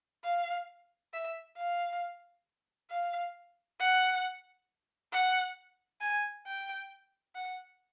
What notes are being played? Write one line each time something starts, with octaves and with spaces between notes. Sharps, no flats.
F5
E5
F5
F5
F#5
F#5
G#5
G5
F#5